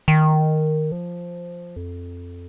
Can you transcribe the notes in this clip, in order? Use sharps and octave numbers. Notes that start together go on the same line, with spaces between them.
D#3
F3
F2